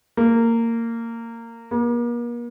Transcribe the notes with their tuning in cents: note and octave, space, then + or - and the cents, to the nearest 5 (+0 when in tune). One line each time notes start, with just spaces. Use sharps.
A#3 -20
A#3 +40